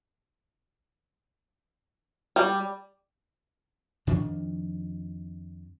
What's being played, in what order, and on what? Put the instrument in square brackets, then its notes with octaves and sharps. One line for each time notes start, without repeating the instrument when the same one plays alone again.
[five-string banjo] G3
[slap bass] F2 D#3 F3 D4